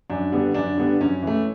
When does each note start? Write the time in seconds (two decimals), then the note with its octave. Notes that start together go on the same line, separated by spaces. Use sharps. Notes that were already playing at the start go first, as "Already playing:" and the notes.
0.10 F#2 D4
0.32 D3 G3 B3
0.54 F#2 D4
0.78 D3 G3 B3
1.00 F#2 C#4
1.23 E3 A3